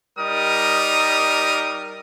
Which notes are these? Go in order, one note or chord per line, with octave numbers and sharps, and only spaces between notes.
G3 D#4 A#4 D#6